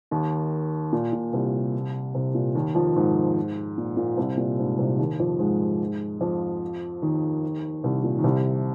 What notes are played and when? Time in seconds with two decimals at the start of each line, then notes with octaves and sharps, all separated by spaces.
0.11 D#2 D#3
0.93 A#2
1.13 A#2
1.33 C2 C3
2.14 C2 C3
2.35 A#2
2.55 D#2 D#3
2.75 F2 F3
2.96 G#2
3.78 A#2
3.97 A#2
4.17 C2 C3
4.37 A#2
4.59 G#2
4.78 C2 C3
4.99 D#2 D#3
5.20 F2 F3
5.39 G#2 G#3
6.21 F2 F3
7.02 D#2 D#3
7.83 C2 C3
8.03 A#2
8.19 D#3
8.24 C2 C3